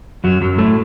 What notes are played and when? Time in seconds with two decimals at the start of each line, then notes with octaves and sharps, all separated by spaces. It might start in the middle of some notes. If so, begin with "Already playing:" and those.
0.24 F#2 F#3
0.41 F#2 F#3
0.58 A2 A3